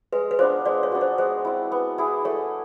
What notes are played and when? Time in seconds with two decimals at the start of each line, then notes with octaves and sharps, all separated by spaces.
0.13 G#3 B4
0.31 B4
0.39 B3 D4 F4 C5
0.65 G#3 D5
0.83 C#5
0.92 B3 D4 F#4
1.01 C5
1.18 G#3 C5
1.45 C4 E4
1.72 B3
1.98 E4 G#4
2.25 A3 C#5